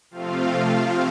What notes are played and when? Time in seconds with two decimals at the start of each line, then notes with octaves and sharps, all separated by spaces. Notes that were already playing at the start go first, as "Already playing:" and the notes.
0.11 C3 F3 A3 C4 F4 F5